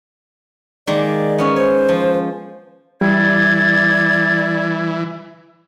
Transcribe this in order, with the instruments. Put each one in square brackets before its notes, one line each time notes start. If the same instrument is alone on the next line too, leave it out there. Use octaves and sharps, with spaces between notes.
[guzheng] D#3 G#3 A#3 [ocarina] D5
[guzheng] B3 C#4 C#5
[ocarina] C5 [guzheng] C#5
[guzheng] F3
[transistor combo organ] E3 [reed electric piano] G3 [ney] D5 [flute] G#6